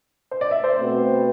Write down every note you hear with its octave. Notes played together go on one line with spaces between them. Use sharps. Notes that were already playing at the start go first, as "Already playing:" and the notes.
C5
D5
E5
C5
B2 A3 C4 F#4 B4